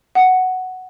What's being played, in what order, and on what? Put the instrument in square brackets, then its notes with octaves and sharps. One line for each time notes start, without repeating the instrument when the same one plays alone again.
[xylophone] F#5